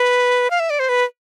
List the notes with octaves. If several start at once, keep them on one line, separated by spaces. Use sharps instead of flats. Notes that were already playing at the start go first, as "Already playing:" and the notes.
Already playing: B4
F5
E5
D5
C5
B4